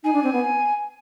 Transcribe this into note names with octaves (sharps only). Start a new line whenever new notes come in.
D#4 G#5
D4
C4
B3